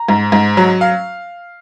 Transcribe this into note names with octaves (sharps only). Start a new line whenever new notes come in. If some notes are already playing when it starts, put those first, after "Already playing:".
Already playing: A#5
G#2
G#2
F#3
F5